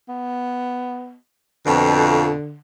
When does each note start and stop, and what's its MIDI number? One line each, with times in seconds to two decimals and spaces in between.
0.09 1.15 59
1.66 2.32 41
1.66 2.32 47
1.66 2.59 50